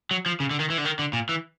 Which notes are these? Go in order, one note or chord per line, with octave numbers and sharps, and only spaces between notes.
F#3
F3
C#3
D3
D#3
E3
D3
D#3
D3
A#2
E3